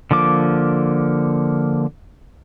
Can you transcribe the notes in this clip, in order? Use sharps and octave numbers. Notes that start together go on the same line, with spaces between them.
D3 F3 A#3 D6